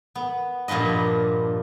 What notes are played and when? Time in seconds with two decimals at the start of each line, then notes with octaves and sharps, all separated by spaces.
0.15 B3
0.68 G2 A#2 F3 B4 D#5